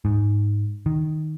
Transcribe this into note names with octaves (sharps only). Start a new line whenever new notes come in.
G#2
D#3